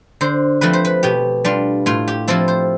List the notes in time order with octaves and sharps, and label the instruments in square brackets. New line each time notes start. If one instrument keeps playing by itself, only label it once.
[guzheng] D3 C5
F3 A3 C4 B4
C5
B4
B2 G4
G3 D4 F4
A2 F4
G4
F3 C4 E4 A4
C5